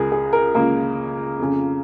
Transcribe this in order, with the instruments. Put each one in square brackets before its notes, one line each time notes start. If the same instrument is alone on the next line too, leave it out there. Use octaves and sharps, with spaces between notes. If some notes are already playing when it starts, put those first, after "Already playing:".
Already playing: [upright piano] C#2 C#3 G#4 A#4
G#4
A#4
C#2 C#3 A#3
F2 C#3